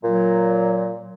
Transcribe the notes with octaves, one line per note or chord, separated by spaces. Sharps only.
A#2 F#3